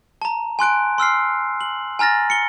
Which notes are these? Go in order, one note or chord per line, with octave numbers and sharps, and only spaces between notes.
A5 A#5
G#5 C6 F#6 D7
C6 E6 F6 C7
F#7
G#5 A#5 F6 A6 A#6
C#7 G7